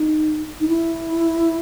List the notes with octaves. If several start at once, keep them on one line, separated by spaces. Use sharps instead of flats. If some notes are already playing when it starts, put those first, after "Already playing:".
Already playing: D#4
D#4
E4